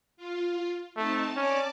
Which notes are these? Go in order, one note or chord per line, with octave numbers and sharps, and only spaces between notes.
F4
A3 C4 D#4 A5
C#4 D5 A5 D6